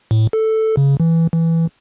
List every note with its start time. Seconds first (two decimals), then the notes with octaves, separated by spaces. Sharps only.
0.11 A2
0.33 A4
0.77 C#3
1.00 E3
1.33 E3